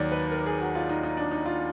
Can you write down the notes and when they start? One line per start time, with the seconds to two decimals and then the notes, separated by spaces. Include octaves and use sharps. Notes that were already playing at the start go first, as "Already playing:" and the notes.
Already playing: D#2 D#3 F#3 D5
0.12 B4
0.31 A#4
0.46 G#4
0.61 F#4
0.75 F4
0.89 D#4
1.03 D#4
1.17 D4
1.31 D#4
1.46 F4